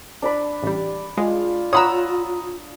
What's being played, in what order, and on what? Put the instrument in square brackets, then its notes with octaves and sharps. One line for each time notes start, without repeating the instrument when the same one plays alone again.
[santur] D4 D5 B5
[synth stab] A1 G3
[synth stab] G#3 [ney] F4 [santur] F5
[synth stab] C#5 F#5 E6 [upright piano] A#5 B5 D#6